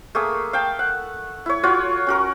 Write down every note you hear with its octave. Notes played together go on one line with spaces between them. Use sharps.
A3 A#3 G#4 D#6
F5 G5 A5
F#5
E4 C#5
F4 F#4 C#5
C#4 F#4 A#4